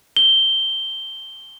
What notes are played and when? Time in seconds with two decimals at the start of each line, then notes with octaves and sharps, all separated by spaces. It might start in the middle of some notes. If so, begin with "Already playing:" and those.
0.17 G7